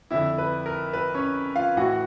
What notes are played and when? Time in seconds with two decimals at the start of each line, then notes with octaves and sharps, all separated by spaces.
0.11 F2 D3 E4 E5
0.38 B4
0.66 A#4
0.93 B4
1.15 C#4 C#5
1.55 F4 F5
1.77 A2 E3 F#4 F#5